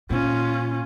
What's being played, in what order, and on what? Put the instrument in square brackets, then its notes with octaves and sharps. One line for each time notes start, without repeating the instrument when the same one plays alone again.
[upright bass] A#2 [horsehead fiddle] C#4 F4